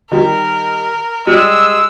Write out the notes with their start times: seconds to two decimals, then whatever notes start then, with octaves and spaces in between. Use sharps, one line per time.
0.12 D#3 G3 A#4
1.27 G3 G#3 D5 E6